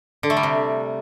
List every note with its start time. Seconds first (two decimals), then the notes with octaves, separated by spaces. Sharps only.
0.23 D3
0.30 A3
0.37 G3
0.43 C3